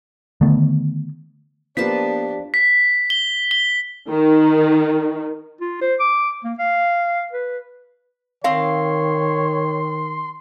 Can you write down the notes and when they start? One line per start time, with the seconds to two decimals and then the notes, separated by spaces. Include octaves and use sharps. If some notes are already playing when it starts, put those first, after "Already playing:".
0.41 D3 D#3 A3 B3
1.77 F3 A#3 B3 D4 G4 B4 A5 B6
2.54 B6
3.10 G7
3.51 G7
4.10 D#3
5.60 F4
5.81 C5
6.00 D6
6.44 A#3
6.59 F5
7.33 B4
8.44 D#3 C4 C#5 F5 C6